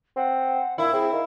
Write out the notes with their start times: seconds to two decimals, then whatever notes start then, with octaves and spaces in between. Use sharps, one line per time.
0.17 C4 F#5
0.78 A#2 E4 F5
0.93 C4 G#4
1.12 D#3 F5